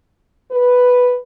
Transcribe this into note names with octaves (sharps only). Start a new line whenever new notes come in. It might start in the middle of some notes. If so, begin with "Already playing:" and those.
B4